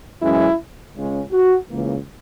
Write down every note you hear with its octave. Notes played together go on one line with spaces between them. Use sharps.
F#2 E3 G#3 C#4 E4
C#2 C#3 G#3 C#4
F#4
C#2 C#3 E3 A#3